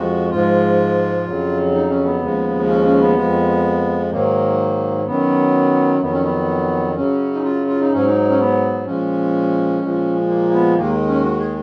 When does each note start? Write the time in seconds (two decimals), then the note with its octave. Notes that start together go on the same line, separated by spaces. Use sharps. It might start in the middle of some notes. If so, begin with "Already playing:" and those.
Already playing: F2 F3 G#3 F#4
0.30 G#2 F3 G#3 F4
1.26 F2 C#3 F#3
1.73 D#4
1.89 C#4
2.05 B3
2.21 D#2 C#3 F3 G#3
2.68 C#4
2.84 C#4
2.99 B3
3.16 F2 F3 G#3
4.11 G#2 D#3 F#3 A#3
5.06 F#2 D#3 F#3 B3
6.01 F2 D#3 F#3 B3
6.12 C#4
6.23 B3
6.96 F#2 C#3 F#3 C#4
7.34 D#4
7.43 F4
7.67 F4
7.80 D#4
7.91 G#2 F#3 C#4
8.05 D#4
8.28 C#4
8.38 B3
8.86 A#2 F3 G#3 C#4
9.81 A#2 F3 G#3
10.29 A#3
10.53 B3
10.76 D#2 D#3 G#3 A#3
11.08 C#4
11.24 F#4
11.39 G#4